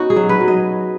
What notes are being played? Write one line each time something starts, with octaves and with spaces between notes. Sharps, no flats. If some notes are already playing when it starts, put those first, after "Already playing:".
Already playing: B3 C#4 D#4 F#4
G#4
F#3
B4
F#3
D#5